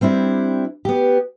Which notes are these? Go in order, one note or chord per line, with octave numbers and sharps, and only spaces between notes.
G3 C4 D4 E4
B3 G4